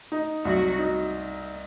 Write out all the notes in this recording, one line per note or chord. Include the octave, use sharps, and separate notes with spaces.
D#4
C2 F#3 F#4
D#4